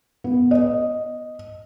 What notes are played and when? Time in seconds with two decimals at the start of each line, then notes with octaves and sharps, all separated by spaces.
0.24 B3
0.51 D#5